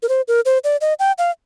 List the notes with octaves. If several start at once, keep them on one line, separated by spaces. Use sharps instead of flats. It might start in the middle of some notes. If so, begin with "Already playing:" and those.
A#4
C5
A#4
C5
D5
D#5
G5
F5